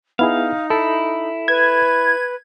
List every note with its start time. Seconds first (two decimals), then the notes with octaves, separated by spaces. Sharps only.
0.19 B3 D#4 E4 G#4 F5
0.70 E4 A4
1.48 B4 G#6